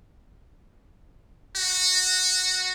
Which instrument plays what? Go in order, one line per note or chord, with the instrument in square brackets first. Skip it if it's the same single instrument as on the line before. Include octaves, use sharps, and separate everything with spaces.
[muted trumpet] F#4